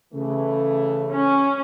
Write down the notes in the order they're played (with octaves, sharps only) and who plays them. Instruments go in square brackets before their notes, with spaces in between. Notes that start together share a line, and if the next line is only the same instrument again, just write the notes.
[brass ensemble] C#3 E3 A3
[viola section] C#4